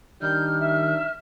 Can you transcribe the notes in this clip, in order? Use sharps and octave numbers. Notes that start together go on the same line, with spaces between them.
D#3 G3 D4 D#4 F6 G6
E5